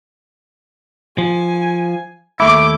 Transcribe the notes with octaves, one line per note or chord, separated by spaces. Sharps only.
F3 G#5
D#2 A3 E4 D6